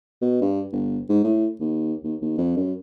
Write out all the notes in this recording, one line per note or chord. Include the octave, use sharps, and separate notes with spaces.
B2
G2
G1
G#2
A2
D#2
D#2
D#2
F2
F#2